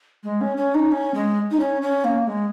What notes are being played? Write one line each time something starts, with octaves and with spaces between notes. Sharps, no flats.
G#3
C#4
C#4
D#4
C#4
G#3
D#4
C#4
C#4
A#3
G#3